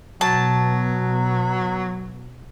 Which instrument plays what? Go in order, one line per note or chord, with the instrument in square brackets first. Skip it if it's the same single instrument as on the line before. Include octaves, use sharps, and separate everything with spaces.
[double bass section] B2 [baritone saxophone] F#3 [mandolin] A5